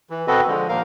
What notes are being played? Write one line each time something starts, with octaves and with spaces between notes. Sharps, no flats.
E3
B2 C4 F#4 A4 B4 D#5
D3 F3 G#3
D#2 A#2 F3 A#4 F5